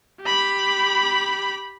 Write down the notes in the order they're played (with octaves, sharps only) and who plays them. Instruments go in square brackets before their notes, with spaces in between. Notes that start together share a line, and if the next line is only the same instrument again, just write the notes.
[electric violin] G4 B5